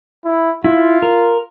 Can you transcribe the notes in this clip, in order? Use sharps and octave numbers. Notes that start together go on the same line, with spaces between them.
E4
E4 F4
A#4